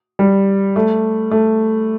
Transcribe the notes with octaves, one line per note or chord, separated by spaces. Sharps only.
G3
A3
A3